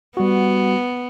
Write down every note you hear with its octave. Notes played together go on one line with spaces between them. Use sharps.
G3 B3 F#4